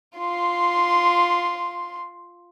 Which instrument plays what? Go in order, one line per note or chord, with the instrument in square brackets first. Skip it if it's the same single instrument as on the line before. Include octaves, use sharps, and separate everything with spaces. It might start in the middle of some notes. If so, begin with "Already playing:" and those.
[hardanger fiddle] F4 C6